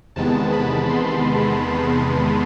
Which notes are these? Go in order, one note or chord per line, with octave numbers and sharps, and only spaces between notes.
E2 C3 D#3 G#3 B3 A5
B5
C6